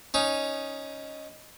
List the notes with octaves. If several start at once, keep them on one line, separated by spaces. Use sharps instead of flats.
C#4 D#4